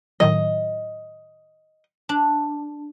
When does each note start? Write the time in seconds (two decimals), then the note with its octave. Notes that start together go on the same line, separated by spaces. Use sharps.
0.20 A2 D#3 F#3 D#5
2.09 D4